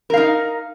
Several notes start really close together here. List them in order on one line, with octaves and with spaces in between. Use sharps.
A#4 F5 D#4